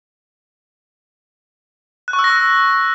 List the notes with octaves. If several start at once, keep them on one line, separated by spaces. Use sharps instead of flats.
F#6
C#6
E6
A#6
E6